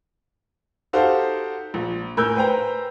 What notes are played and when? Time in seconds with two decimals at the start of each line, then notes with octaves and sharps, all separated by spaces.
0.93 D#4 F#4 G4 A4 C5 F5
1.74 A#1
2.17 A2 A#4 G#5 E6 G6
2.35 B4 C5 G5 A#5